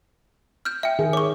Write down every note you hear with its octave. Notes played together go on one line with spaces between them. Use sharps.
F6 G6
E5 G5
D#3 G#4
C#5 C#6 D6